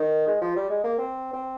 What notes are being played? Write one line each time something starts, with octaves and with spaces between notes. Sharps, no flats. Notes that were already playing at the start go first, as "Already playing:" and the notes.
Already playing: D#3
G#3
F3
G3
G#3
A#3
C4
C4